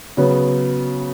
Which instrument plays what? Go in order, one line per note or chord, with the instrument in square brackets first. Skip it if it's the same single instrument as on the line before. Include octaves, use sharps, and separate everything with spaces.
[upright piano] C#3 F#3 B3